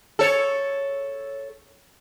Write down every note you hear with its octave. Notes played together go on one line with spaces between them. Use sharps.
A4 C#5